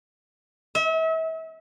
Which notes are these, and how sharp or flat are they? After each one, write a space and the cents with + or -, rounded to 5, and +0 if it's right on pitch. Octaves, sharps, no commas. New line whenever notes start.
E5 -40